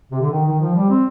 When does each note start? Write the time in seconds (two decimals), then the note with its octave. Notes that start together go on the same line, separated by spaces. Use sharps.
0.11 C3
0.21 D3
0.31 D#3
0.46 D#3
0.60 F3
0.75 G3
0.89 C4